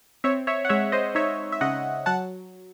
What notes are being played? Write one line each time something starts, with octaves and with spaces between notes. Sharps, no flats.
C4 C#5 E5
C#5 E5
F#5
G#3 C#5 E5
C5 D#5
D#4 C#5 E5
E5
C#3 D#5 F#5
F#3 F#5 A5